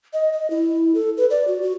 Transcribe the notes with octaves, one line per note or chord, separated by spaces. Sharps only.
D#5
D#5
E4
A4
B4
D5
F#4
F#4